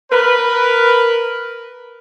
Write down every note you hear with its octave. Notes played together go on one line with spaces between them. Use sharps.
A#4 B4